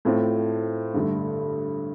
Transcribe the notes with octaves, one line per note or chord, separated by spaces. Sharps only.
A2 A3 C4 F4
G2 D3 A3